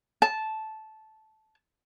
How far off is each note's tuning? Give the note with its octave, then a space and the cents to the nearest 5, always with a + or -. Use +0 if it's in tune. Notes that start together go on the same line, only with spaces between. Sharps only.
A5 -10